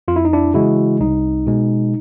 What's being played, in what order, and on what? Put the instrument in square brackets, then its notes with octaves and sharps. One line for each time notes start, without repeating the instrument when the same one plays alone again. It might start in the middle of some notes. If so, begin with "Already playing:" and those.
[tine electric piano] F2 F4
E4
D#4
D4 E4
C#3 E3 G#3 E4 F#4
C2 D#4
B2 G#3